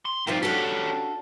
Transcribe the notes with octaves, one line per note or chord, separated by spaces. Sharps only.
C6
C3 D#3 F3 G3 F4
C#4 D4 F#4 G4 A4